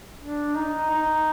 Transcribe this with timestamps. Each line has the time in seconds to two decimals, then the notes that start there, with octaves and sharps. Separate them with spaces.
0.21 D4
0.56 D#4
0.90 D#4